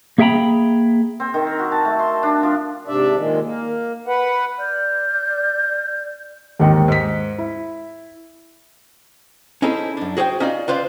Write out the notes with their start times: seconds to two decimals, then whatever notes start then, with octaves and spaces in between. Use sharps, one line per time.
0.18 A#3 G#4 E5 G5 A#5 B5
1.20 C4
1.34 D#3
1.47 A#4
1.59 F#4
1.72 A5
1.85 A3
1.99 C6
2.23 D4
2.43 F3
2.87 G#2 C3 D4 D5 E5
3.16 A#2 D#3 G#3
3.43 A#3
4.07 B4 F#5
4.58 D5 F6 G6
6.59 D#2 G#2 D#3
6.88 G#2 B6
7.38 E4
9.62 C#4 D#4 E4 G#4 A4 C5
9.97 F#2 D4
10.17 F#4 G#4 C5 D5 G5
10.40 C#4 D#4 F4 D5
10.68 F4 B4 C5 D5 F5